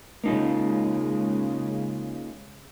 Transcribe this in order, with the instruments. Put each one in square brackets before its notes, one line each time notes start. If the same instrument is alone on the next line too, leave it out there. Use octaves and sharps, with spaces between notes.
[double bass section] C#3 G#3 [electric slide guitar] A#3 D#4 F4